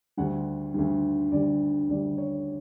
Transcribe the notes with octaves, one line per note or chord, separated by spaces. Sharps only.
D2 D3 G3 F#5
D2 D3 G3
D2 D3 G3 D5
D2 D3 G3 D5
C#5